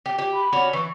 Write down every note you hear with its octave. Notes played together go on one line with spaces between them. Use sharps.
G4
G4
B5
C#4 D4 F#4
E3 C#6